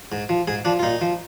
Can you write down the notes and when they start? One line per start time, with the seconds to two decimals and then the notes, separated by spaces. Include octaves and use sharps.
0.12 G#2
0.29 F3
0.48 G#2 G#4
0.65 F3 D4
0.79 F4
0.83 A#2 D#4
1.01 F3